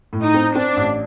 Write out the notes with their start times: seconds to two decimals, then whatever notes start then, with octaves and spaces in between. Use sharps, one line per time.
0.13 A2
0.23 D#4
0.34 C4
0.55 C4 D4
0.77 A1